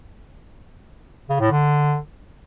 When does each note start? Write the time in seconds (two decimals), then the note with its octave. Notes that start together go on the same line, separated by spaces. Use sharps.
1.30 C#3
1.40 A2
1.51 D3